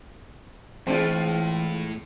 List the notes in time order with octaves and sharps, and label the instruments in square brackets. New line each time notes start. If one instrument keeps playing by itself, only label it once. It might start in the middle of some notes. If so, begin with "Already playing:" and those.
[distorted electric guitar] A2 [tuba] E3 [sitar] G#3 F4 [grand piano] C4 D4